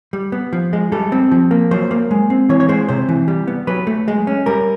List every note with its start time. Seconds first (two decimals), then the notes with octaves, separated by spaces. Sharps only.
0.13 G3
0.32 B3
0.53 F3
0.73 G#3
0.92 G3 A4
1.12 C4
1.32 F3
1.51 A#3
1.71 F#3 C5
1.91 A#3
2.11 G#3
2.30 C4
2.49 E3 C#5
2.60 C#5
2.69 G#3 C5
2.89 C3 C5
3.09 E3
3.28 G3
3.48 B3
3.67 F#3 B4
3.87 A3
4.08 G#3
4.27 C#4
4.46 G3 A#4